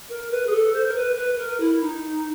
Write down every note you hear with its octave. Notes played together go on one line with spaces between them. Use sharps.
A#4
B4
G#4
A4
C5
A#4
B4
B4
A#4
E4
D#4